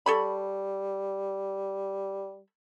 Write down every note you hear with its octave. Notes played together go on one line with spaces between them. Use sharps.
G3 A4 C#5 B5